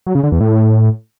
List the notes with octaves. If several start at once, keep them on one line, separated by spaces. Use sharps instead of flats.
F#3
C#3
D3
E2
A2